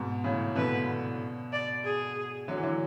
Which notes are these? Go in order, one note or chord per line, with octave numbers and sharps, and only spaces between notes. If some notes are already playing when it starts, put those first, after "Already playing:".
Already playing: G#2 B2
A2 C#3
B2 D3 B4
D5
G#4
D3 F#3
E3
D3 F#3